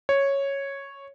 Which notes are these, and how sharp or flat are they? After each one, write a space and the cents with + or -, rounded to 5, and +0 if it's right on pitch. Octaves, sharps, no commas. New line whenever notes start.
C#5 -5